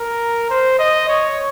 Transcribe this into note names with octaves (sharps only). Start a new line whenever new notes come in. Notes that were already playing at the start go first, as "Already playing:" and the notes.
Already playing: A#4
C5
D#5
C#5